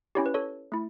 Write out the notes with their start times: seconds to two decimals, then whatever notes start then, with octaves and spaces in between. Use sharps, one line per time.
0.15 C#4 E4 G4 C#5
0.26 B4
0.34 A4 C#5
0.72 A3 E4